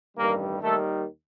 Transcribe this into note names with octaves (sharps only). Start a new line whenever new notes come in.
A1 G2 D#3 G3 A#3 A#4
D#2 D#3 G3 A3 A4